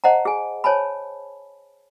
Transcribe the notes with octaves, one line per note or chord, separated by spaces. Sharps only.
C5 D#5 F#5 A5 A#5
G#4 G#5
C5 C#5 G#5 A5 B5